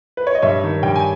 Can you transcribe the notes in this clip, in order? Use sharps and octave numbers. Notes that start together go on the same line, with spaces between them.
B4
C#5
D#5
G2 C#5 E5
D#3
G2 G5
G#5